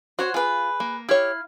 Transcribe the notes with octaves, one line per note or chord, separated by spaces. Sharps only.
F#4 C5 C#5 F#5
F4 G#4 B4
A#3
E4 G4 C#5 F5